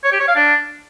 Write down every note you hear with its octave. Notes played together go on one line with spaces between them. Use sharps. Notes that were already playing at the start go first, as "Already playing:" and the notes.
C#5
G4
C#5
F5
D4